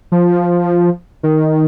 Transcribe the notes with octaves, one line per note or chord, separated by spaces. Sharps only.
F3
D#3